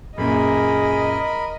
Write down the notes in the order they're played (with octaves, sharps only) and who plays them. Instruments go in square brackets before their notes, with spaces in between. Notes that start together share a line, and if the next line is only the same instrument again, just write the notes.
[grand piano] F#2 A#2 [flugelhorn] G#4 [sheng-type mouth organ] A#4 B5 [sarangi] D#5